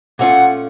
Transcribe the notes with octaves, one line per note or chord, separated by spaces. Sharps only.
A#2 A3 C#4 F4 F#5